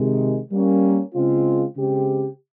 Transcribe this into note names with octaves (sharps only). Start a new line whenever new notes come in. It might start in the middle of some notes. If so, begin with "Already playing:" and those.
Already playing: C3 D#3 G#3
G3 A#3 C#4
C#3 G#3 C4 F4
C#3 G#3 C4 G4